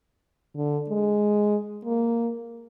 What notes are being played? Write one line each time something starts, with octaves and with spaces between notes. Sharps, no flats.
D3
G#3
A#3